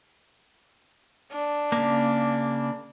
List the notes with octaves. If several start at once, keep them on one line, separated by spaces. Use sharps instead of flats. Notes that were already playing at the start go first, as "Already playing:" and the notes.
D4
C#3 A#3